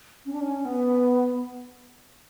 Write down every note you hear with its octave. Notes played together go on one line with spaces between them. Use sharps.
C#4
D4
C#4
B3